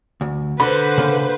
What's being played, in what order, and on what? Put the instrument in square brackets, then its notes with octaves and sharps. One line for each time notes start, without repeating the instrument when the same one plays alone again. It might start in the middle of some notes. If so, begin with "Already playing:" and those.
[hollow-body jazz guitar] D2
[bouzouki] D3 [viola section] B4 C5 [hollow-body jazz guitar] B5
[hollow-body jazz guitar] C#3 A#3